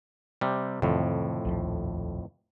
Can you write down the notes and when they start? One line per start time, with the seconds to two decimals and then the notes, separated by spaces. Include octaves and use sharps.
0.41 C3 G3
0.82 F2 A2 C3 D#3 E3
1.45 A#1 D#2 F3